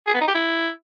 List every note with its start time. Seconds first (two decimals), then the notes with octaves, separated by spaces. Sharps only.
0.07 G#4
0.14 B3
0.21 D#4
0.28 G4
0.35 E4